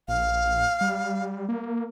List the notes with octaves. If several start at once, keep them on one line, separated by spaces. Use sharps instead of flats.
A#1 F5
G3
A#3